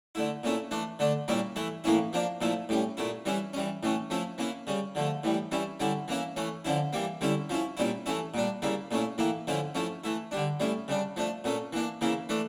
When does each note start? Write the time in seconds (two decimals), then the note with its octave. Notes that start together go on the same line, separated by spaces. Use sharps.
0.15 D3 A3 E4
0.43 A#2 A3 C#4 E4
0.71 E3 A3 D4
0.99 D3 A3 D4
1.28 A#2 G3 A#3 C#4 E4
1.56 E3 A3 E4
1.84 A2 E3 A#3 C#4 E4
2.13 F3 A#3 D4
2.41 A#2 F3 A3 E4
2.69 A2 G3 C#4
2.97 A#2 A3 E4
3.25 E3 G3 C#4 E4
3.53 E3 G3 C#4
3.83 A2 E3 A3 C#4
4.10 F3 A3 C#4 E4
4.38 E3 A#3 C#4 E4
4.67 C#3 G3 C#4
4.95 D3 F3 A3
5.24 A2 E3 G3
5.51 E3 G3 C#4 E4
5.80 D3 G3 C#4 E4
6.08 E3 A#3 C#4 E4
6.36 E3 A3 C#4
6.65 D3 F3 C#4 E4
6.93 E3 G3 A#3
7.21 D3 G3 C#4 E4
7.50 F3 C#4 E4
7.77 A#2 G3 C#4 E4
8.06 E3 A3 C#4 E4
8.34 A#2 G3 D4
8.62 C#3 G3 A#3 E4
8.91 A#2 A3 C#4 E4
9.18 A2 E3 A#3 E4
9.47 D3 F3 A3 C#4 E4
9.75 F3 A3 C#4 E4
10.04 E3 A3 E4
10.31 D3 G3 D4
10.60 A2 G3 C#4 E4
10.88 C#3 G3 D4
11.16 F3 A3 D4
11.44 A#2 A3 C#4
11.73 E3 A#3 D4
12.01 C#3 E3 A#3 E4
12.29 E3 A3 D4